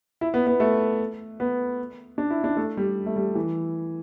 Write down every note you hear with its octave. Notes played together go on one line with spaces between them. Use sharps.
E4
B3
B3
A3
B3
D4
E4
D4
A3
G3
A3
G3
E3